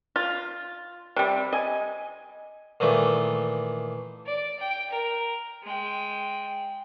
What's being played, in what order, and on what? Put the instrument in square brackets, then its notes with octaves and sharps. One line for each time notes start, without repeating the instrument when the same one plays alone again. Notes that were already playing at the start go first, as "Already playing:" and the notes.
[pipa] F4
C3 G3
D#5 G#5
[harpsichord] A#2 D#3 E3 A3
[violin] D5
G5
A#4
[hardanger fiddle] G#3 G5